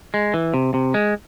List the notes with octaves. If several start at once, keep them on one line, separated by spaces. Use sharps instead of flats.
G#3
E3
C3
C3
G#3